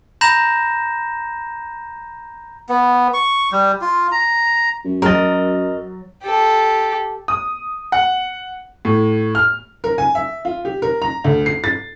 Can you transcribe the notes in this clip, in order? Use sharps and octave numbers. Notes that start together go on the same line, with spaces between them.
A#5 B5 G6 A#6 E7
B3
C#6
G3
F4
A#5
F#2
F#3 A#4 D#5 A6
G4 A4
D#6
F#5
A2
F6
A#4
G#5
E5
F4
G4
A#4
A#5
D2
C7
A6